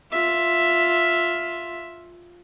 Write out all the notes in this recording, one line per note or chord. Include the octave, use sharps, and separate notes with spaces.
F4 E5